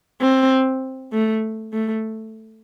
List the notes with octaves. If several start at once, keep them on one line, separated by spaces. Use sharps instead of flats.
C4
A3
A3